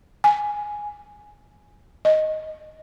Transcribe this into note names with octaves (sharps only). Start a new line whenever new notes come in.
G#5
D#5